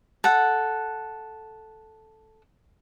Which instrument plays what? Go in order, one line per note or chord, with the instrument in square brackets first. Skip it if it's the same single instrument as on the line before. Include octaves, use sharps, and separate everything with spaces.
[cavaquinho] A4 F#5